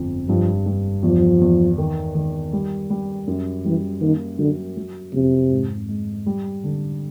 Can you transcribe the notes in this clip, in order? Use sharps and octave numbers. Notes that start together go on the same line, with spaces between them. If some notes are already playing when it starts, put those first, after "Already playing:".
Already playing: G1 F2
G2 F3
G2
E2 F3
E2
D#3
D#3
G3
G3
F#2
E3 G3
D#3 A#3
D3 F#3
F#3
F2 C3
G#2
G#3
G3
D3